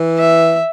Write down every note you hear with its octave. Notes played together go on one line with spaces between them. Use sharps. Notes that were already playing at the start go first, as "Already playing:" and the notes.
Already playing: E3
E5